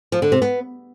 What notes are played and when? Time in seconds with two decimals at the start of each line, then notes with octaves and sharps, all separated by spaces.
0.12 F3
0.22 D3
0.32 C3
0.42 B3